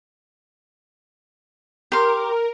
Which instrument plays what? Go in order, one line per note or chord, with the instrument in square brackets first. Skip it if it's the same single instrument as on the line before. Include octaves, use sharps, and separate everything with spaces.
[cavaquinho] G4 C6 [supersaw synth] A#4